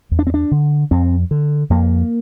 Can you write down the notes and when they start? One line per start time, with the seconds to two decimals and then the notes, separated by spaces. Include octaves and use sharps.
0.11 E2
0.19 D4
0.27 C4
0.34 D4
0.51 D3
0.91 F2 C4
1.31 D3
1.70 F2 A#3